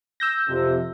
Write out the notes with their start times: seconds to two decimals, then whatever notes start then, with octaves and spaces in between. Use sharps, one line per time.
0.20 E6 G6 A#6
0.49 F2 C3